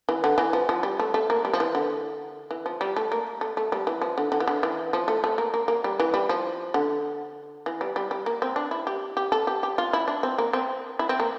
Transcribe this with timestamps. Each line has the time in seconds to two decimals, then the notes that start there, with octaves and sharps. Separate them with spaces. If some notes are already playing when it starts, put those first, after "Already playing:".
0.09 E3
0.24 D3
0.38 E3
0.53 F3
0.69 F3
0.83 G3
0.99 A3
1.14 A3
1.30 A#3
1.45 G3
1.53 F3
1.60 E3
1.75 D3
2.51 E3
2.66 F3
2.81 G3
2.96 A3
3.12 A#3
3.41 A3
3.57 A3
3.72 G3
3.87 E3
4.02 F3
4.18 D3
4.32 D3
4.40 E3
4.48 D3
4.63 E3
4.93 F3
5.08 A3
5.24 A3
5.38 A#3
5.54 A#3
5.68 A#3
5.84 G3
6.00 E3
6.14 G3
6.29 F3
6.74 D3
7.66 E3
7.81 G3
7.96 G3
8.11 G3
8.26 A#3
8.42 C4
8.56 D4
8.71 E4
8.87 G4
9.17 G4
9.32 A4
9.47 G4
9.63 G4
9.78 F4
9.93 E4
10.08 D4
10.23 C4
10.38 A#3
10.53 C4
10.99 E4
11.09 C4
11.20 A#3